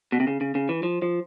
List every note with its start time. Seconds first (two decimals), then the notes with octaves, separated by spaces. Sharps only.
0.12 B2
0.20 C3
0.27 C#3
0.41 C#3
0.55 C#3
0.69 E3
0.83 F3
1.02 F3